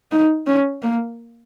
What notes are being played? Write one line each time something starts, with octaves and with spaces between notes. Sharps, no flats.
D#4
C#4
A#3